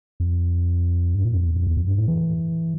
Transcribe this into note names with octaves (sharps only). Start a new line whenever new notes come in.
F2
G2
A#2
F2
E2
F2
E2
F2
G2
A2
E3